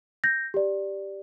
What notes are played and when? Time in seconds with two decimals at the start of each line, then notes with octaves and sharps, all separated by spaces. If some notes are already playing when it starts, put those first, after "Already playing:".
0.24 G6 A#6
0.54 G4 D5